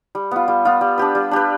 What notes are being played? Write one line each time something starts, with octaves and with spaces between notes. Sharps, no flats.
G3
B3 F4
G3
B3 F4
G3
D4 G4 B4
G3
D4 G4 B4